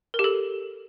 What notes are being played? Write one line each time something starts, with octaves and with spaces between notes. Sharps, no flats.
A#4
G4
A4